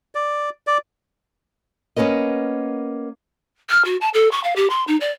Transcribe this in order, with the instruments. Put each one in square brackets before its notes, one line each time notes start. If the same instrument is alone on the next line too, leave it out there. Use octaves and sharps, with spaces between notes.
[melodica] D5
D5
[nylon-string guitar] A#3 B3 C#4 A#4 D#5
[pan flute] F6
F#4
A5
A4
C#6
F5
G4
C6
D#4
D5